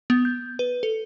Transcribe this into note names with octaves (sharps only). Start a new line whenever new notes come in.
B3
G6
B4
A4